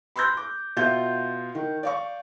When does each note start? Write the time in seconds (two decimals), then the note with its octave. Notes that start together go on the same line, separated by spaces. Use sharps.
0.16 B5 C6 E6 F#6 G6 A#6
0.37 D6
0.76 B2 F4 E5 G6
1.55 D#3
1.83 D5 F5 C#6